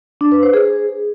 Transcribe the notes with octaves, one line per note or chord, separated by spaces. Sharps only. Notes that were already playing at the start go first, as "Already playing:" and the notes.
D4
B4
C5
G#4